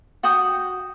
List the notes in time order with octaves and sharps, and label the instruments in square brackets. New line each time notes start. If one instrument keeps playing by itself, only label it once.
[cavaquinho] F#4 F#5 G5 D#6